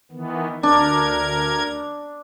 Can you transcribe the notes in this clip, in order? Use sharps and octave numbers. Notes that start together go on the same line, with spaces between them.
D#3 E3 B3
D2 D4 A#4 G#6